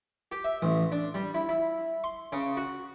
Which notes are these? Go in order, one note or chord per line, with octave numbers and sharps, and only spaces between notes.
G4
E5
A1
D4
G3
E4
E4
C6
C#3
F#4